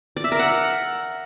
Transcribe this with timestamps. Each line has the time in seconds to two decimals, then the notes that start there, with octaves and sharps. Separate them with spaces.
0.17 D5
0.24 E5
0.32 A#4
0.39 F#5